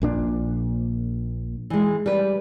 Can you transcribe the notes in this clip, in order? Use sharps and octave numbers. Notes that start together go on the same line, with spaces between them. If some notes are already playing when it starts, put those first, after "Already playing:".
A#1 A#2 D4
E3 G#3
G3 B4